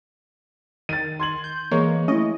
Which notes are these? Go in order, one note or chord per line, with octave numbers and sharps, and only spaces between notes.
D#3 A6 D#7
C6 G#6 F#7
G6
E3 G#3 A#3 C#5 C#6
A3 C#4 E4 D#5